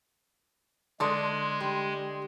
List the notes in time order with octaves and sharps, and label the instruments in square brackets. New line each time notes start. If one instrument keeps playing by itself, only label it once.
[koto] D3 D4 [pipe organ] G#3 [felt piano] C6 D#6
[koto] G3